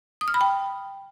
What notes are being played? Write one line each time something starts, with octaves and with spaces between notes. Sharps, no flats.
D#6
F6
B5
G5